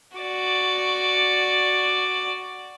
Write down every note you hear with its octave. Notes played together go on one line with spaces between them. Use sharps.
F#4 D5